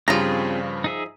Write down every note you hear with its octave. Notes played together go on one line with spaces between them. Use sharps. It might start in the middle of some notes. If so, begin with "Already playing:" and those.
G2 C#3 F3 G3 C4 F4 G#4 A#5
D#4 G#4 E5